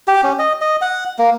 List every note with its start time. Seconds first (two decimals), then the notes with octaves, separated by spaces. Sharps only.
0.08 G4
0.23 C#4
0.39 D#5
0.61 D#5
0.81 F#5
1.19 A#3